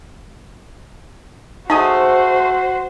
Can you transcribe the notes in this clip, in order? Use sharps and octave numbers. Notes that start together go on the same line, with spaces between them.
A3 D#4 F#4 G#4 C5 D#5